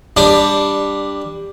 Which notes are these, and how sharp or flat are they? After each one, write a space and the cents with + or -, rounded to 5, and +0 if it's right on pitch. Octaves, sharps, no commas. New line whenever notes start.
G3 +15 D4 +0